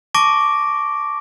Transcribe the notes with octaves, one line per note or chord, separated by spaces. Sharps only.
A5 C#6 D6 A#6 D7